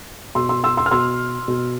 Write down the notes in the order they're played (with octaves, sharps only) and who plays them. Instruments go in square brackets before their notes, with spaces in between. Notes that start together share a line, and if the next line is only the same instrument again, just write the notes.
[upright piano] B2 C6 E6
C6 E6
C6 E6
C6 E6
F6
B2 C6 E6
B2